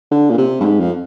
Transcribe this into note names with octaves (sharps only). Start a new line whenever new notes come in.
D3
A#2
C3
G2
G#2
F2